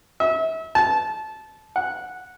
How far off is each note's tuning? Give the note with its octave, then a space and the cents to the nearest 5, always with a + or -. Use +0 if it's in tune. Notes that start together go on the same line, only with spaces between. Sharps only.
E5 -35
A5 -20
F#5 -10